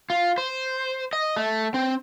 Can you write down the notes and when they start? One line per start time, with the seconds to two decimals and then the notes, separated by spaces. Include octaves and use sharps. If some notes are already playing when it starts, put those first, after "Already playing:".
0.10 F4
0.38 C5
1.13 D#5
1.36 A3
1.74 C4